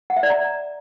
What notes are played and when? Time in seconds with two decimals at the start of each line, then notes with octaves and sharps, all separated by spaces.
0.10 F#5
0.17 E5
0.23 D5
0.30 A#5